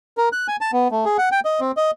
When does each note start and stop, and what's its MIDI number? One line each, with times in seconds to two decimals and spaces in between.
0.18 0.29 70
0.33 0.47 90
0.48 0.56 80
0.61 0.71 81
0.73 0.88 59
0.91 1.05 57
1.05 1.17 68
1.18 1.29 78
1.32 1.40 79
1.45 1.60 75
1.60 1.72 60
1.77 1.91 75